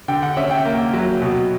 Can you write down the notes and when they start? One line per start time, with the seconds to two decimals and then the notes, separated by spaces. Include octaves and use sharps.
0.08 D3 G5
0.23 F#5
0.37 C#4 E5
0.51 G5
0.65 A#3
0.93 F#3
1.22 B2